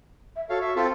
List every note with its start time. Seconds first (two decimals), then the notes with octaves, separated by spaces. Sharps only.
0.36 E5
0.50 F#4 A4 C#5 F5
0.61 E5
0.76 C4 F4 A4